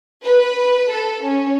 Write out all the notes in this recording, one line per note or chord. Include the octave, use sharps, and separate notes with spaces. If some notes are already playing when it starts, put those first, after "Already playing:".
B4
A4
C#4